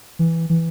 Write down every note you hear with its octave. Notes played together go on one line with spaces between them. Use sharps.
E3
E3